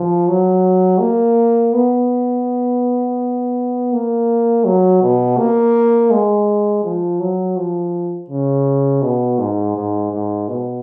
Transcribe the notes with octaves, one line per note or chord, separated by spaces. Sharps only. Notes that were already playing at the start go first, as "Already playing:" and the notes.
Already playing: F3
F#3
A#3
B3
A#3
F#3
B2
A#3
G#3
F3
F#3
F3
C#3
B2
G#2
G#2
G#2
B2